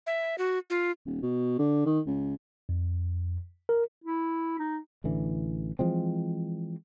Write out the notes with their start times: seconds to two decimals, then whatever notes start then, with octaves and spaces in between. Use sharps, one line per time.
0.07 E5
0.38 F#4
0.70 F4
1.06 D#1
1.22 B2
1.59 D3
1.86 D#3
2.07 C#2
2.69 F2
3.69 A#4
4.04 E4
4.59 D#4
5.04 A1 D3 E3
5.79 E3 F3 G#3 C4